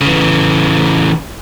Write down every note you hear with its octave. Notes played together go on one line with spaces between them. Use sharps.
C#3 E3